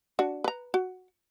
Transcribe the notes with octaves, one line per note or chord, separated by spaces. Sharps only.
D4 F#4
B4 A#5
F#4